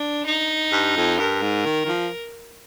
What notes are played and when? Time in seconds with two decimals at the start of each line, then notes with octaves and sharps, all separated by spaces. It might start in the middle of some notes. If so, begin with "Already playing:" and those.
Already playing: D4
0.26 D#4
0.72 G2
0.96 F2
1.19 G2 A#4
1.42 G#2
1.66 D#3
1.85 D#3
1.88 F3